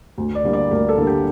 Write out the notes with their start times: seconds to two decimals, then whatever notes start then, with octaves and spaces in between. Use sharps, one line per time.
0.18 D2
0.35 D5
0.44 D3 G3 A#3
0.53 D5
0.71 D2 A#4
0.89 A4
0.98 D3 G3 A#3
1.07 G4